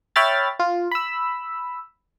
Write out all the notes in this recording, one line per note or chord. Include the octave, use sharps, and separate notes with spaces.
C#5 E5 G5 B5 F6 A6
F4
B5 E6